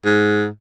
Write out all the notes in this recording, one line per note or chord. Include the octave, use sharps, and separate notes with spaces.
G#2